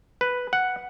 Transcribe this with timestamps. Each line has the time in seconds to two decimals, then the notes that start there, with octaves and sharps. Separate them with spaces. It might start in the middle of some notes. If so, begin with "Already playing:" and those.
0.21 B4
0.53 F#5